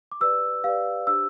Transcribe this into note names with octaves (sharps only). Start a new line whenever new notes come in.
D6
G4 B4 D5 E6
G4 B4 D5 F5
D4 G4 C5 E6